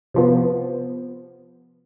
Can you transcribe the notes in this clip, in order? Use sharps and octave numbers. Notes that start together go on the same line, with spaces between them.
C3 F3 B3